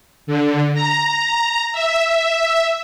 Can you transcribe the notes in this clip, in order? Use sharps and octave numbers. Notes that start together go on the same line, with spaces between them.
D3
A#5
E5